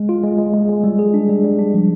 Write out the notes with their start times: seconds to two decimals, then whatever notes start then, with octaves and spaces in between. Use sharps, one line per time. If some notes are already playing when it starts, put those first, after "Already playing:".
Already playing: G#3
0.09 F4
0.24 G#3
0.39 G#3
0.54 G#3
0.69 G#3
0.84 G3
0.99 G#4
1.14 D4
1.29 G3
1.44 G3
1.59 D4
1.74 F3